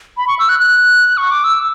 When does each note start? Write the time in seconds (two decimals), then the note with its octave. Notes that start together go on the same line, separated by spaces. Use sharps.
0.17 B5
0.28 C#6
0.39 E6
0.49 F#6
0.60 F#6
1.17 C#6
1.31 D6
1.44 E6